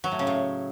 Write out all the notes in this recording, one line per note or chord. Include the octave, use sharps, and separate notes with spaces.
F#3
A2
C#3
A2